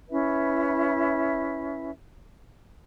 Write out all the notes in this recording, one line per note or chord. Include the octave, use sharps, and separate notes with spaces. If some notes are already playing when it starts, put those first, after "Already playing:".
C#4 E4 B4 E5